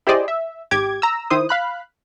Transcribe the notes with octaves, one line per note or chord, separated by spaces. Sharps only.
E4 G4 G#4 C5 D5 D#5
E5
G#1 G4 D6 G#6
A#5 E6
D#3 E4 C5 D#6
F5 B5 F#6